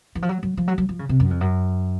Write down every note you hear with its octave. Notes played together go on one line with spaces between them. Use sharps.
E3
F3
F#3
F#3
F3
F#3
F#3
F3
C#3
C3
F#2
F2
F#2